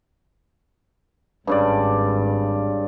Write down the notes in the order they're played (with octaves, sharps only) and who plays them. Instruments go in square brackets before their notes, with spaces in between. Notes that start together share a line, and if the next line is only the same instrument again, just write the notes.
[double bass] G#1 [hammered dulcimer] G2 C#3 D5